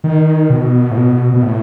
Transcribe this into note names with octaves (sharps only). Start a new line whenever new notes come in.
D#3
B2
A2
B2
B2
A2